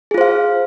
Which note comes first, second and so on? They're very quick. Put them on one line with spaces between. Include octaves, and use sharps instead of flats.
G#4 F4 C5 F5